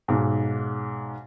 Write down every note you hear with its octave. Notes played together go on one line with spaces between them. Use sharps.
B1 G#2